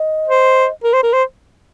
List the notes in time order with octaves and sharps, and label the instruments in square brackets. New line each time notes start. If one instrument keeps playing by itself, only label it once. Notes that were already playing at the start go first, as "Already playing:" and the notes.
Already playing: [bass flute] D#5
[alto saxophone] C5
A#4
C5
A#4
C5